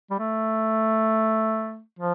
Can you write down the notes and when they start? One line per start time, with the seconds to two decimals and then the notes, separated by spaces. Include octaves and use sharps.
0.11 G3
0.19 A3
1.99 F3